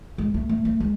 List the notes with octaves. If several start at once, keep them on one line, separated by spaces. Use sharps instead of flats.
G#3
A3
A3
A3
G#3